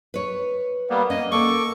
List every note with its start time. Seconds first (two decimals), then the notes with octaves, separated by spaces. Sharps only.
0.14 B4 C#5
0.90 G3 A#3 B3
1.10 A#3 C#4 D#5
1.32 A#3 A4 C#6 D6